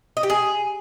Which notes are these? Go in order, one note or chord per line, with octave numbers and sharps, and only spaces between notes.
D#5
G4
G#4